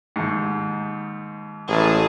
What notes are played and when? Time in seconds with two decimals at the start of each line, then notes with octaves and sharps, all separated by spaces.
0.16 D#2 G#2
1.68 A1 G#4 A5